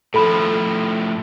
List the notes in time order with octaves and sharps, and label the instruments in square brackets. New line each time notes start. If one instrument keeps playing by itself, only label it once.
[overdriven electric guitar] A2 F3 [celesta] A4 B5